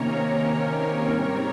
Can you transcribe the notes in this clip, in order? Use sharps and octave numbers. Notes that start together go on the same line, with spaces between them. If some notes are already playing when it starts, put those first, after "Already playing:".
Already playing: C3 D#3 A#3 C#4 A#4 C#5
G#2 G3 C4